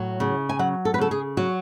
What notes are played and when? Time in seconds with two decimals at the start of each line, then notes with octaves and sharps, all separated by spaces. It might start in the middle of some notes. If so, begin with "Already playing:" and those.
Already playing: A2 F#3
0.20 C#3
0.49 G#5
0.59 F#3 F#5
0.85 A4
0.94 B4
0.98 C#3 A4
1.11 G#4
1.37 F#3 F#4